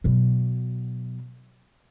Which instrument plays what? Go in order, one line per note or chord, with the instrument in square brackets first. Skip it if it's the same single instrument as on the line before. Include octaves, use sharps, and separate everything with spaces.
[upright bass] B2 F#3